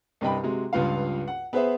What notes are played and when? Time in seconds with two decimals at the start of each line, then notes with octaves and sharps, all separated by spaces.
0.21 C2 G2 D#5 G5 B5
0.43 C3 F#3 G#3
0.73 C#2 G2 F4 B4 F5
1.28 F#5
1.53 B3 G#4 B4 C5 E5